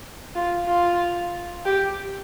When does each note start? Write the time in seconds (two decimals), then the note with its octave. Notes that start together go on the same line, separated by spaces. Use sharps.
0.35 F4
0.67 F4
1.65 G4